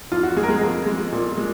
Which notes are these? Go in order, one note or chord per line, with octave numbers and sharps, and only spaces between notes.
F2 F4
F#4
G#3 G#4
A#4
G#3 G#4
F2
G#3
A#2
G#3